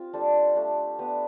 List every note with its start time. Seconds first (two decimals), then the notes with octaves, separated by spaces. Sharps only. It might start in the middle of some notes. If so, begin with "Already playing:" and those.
Already playing: C4 F4 G4
0.13 G3 D4 A4 C5
0.55 A3 D4 G4
0.99 B3 D4 G4